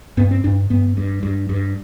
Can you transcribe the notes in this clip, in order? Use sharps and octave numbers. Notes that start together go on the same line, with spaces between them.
G2 B3
C4
G2 D4
G2 B3
G2
G2
G2